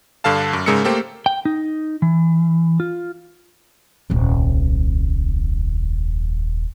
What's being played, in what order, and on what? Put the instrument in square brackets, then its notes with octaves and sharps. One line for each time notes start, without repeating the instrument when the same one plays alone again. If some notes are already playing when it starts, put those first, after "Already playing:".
[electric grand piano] G2 D3 A4 F5 A5
F#2
G#2 C#3 G#3 A#4 E6 C#7
A3 A#3 G4 A4 C5
[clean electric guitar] G5
D#4
E3
F4
[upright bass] D#1 C2